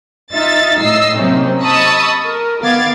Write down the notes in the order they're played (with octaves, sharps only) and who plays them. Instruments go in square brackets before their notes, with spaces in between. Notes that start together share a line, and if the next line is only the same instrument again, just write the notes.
[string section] D#4 F4 E5 A6
A2 D#5 E6 C7
C3 F#3 A#3 C4 C#4 D#4
D#5 A5 B5 C#6 D#6 E6
A#4
D#3 B3 F5 D6 G#6 A6